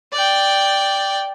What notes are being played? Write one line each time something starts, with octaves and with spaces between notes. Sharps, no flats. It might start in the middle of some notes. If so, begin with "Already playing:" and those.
D5 G5